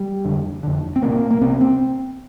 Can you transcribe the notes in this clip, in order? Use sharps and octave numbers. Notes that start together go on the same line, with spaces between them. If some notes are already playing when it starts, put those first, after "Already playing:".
Already playing: G3
F2 D3
F2 D3
C4
C2 A#2 A#3
A#3
C2 C3 C4
C4